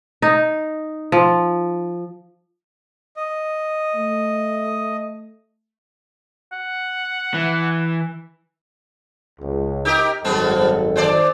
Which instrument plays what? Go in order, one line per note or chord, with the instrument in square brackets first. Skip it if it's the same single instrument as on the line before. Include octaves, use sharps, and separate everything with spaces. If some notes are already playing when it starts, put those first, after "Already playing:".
[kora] D#4
F3
[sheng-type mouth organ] D#5
[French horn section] A3
[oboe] F#5
[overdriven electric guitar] E3
[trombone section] C#2
[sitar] D#4 G4 A#4
[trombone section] G#1 F#2 A4 [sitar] G3 B3 C4
[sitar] D#3 C5 D5